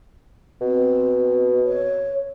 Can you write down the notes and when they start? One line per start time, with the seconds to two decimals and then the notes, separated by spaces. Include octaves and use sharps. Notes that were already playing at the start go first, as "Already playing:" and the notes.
0.61 B2 C4
1.65 C#5